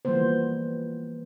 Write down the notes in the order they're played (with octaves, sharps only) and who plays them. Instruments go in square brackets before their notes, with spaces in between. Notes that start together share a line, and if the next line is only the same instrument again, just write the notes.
[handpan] E3 F3 G3 A#3 B3 C5